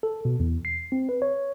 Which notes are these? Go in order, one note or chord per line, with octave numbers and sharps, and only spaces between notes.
A4
B2
E2
C7
C4
B4
C#5